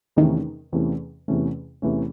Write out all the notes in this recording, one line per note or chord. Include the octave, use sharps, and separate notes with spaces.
E2 C3 D#3 E3 A3 C#4
E2 C3 E3 A3 C#4
E2 C3 E3 A3 C#4
E2 C3 E3 A3 C#4